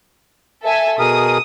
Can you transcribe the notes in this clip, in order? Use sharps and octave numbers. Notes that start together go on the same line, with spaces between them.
A4 E5 G#5
B2 G#4 A#4 D#6